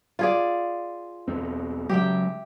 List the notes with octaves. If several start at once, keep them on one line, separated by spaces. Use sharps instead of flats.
F4 G#4 D5
E1 E2 C4
C#3 F#3 G#3 G4 E5 G5